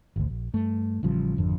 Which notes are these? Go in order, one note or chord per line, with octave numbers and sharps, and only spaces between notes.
G#1 D2
A#1
G2 A3
A1 C#3 F3 G3
G#1 F2 D3